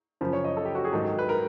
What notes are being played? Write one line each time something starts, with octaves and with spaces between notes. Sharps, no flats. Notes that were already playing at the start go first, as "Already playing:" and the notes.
F#2 C#3 F3 C5
C#5
D#5
A4
G4
F#4
G#4
G#2 D#3 F#3 A4
B4
A#4